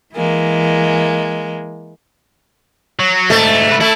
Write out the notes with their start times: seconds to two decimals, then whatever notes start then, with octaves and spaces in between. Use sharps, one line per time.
0.14 E3 G#3 A#3
2.99 F#3
3.30 D2 G#2 A3
3.68 G#2 B4
3.81 A3 E4